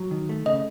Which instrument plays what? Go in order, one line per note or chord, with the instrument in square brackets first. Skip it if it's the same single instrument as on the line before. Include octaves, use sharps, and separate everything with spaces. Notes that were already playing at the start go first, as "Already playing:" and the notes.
Already playing: [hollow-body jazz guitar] F#3
D#3
A3
[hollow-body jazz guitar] C#3 [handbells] D#5